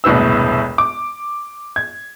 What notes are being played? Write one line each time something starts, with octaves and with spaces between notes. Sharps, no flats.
E1 C2 A2 B3 E6
D6
G#6